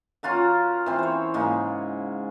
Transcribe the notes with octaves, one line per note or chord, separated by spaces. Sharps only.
C#4 F4 F#4 A#4
E3 C4
C5 C#5
G#2 C#3 A#3